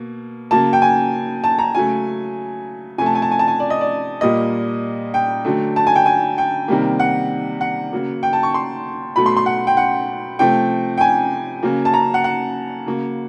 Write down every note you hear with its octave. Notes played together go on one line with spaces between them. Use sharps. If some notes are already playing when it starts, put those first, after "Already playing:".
Already playing: B2 A#3
C#3 F#3 A#3 A5
G5
G#5
A5
A#5
C#3 F#3 A3 G#5
C3 F3 A3 G#5
A5
G#5
A5
G#5
A5
G#5
D5
D#5
D5
A#2 G3 A#3 D#5
G5
D3 F#3 A3
A5
G#5
G5
G#5
G5
C3 D#3 G3 A#3
F#5
F#5
C#3 F#3 A#3
G5
A5
C#6
C6
B2 F#3 A3 B5
C6
C6
F#5
G5
F#5
C3 F3 A3 G5
G5
G#5
C#3 F#3 A#3
A5
A#5
F#5
F#5
C#3 F#3 A#3